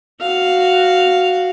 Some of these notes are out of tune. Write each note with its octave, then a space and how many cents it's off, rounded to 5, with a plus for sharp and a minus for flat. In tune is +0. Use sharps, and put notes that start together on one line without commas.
F#4 +0 F5 +0